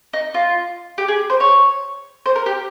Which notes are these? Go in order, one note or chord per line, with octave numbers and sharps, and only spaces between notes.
D#4
F4
G4
G#4
C5
C#5
C5
A#4
G4